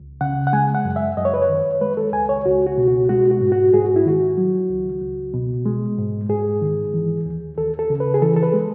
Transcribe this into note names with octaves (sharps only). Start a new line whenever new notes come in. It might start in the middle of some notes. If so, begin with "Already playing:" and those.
Already playing: C#2
C#3 F#5
F#5
G#3 G#5
F#5
F#2
E5
F#2 D#5
C#5
B4
C#5
D#3
G#3 B4
A4
C#2 G#5
C#5
C#2 F#4
F#4
B2
F#4
G#3 F#4
F#4
G#2
F#4
G#2 G#4
F#4
E4
D#3 F#4
F#3
C#2
C#2
B2
G#3
G#2
G#2 G#4
D#3
E3
D#2
D#2 A4
A4
C#3
B4
G#4
E3 A4
A4
B4
G#3